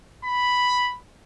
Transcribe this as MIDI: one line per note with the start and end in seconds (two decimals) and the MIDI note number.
0.25 0.96 83